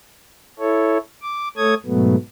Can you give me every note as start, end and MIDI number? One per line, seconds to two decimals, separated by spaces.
0.59 0.98 64
0.59 0.98 69
0.59 0.98 73
1.22 1.48 86
1.57 1.74 57
1.57 1.74 69
1.57 1.74 73
1.57 1.74 87
1.57 1.74 92
1.86 2.16 44
1.86 2.16 47
1.86 2.16 54
1.86 2.16 57
1.86 2.16 59